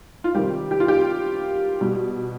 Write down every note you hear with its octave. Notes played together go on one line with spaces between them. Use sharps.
F4
C3 D#3 G3 G4
G4
F4
G4
B2 G3